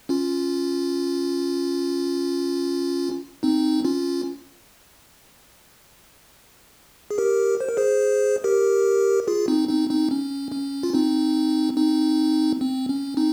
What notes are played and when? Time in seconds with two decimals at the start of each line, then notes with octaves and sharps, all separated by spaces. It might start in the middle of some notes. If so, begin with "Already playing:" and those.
0.09 C#4 F4
3.43 C4 D#4
3.84 C#4 F4
7.11 G#4
7.18 G4 A#4
7.60 C5
7.69 A#4
7.77 G#4 C5
8.44 G4 A#4
9.27 F4 G#4
9.48 C4 D#4
9.68 C4 D#4
9.90 C4 D#4
10.11 C#4
10.52 C#4
10.83 F4
10.94 C4 D#4
11.77 C4 D#4
12.61 C4
12.89 C#4
13.17 C4 D#4